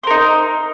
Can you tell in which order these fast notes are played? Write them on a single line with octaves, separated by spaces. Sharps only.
C5 A#4 D#4